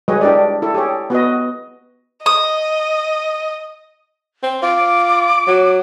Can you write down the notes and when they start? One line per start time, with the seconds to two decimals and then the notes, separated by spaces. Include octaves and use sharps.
0.08 G3 G#3 F#4 B4 C#5 D#5
0.21 D4 E4 G4 A#4 D5
0.62 E4 G4 A4
0.74 G4 G#4 C#5
1.10 B3 F#4 B4 D#5
2.26 D#5 D#6
4.43 C4
4.63 F4 D6
5.47 F#3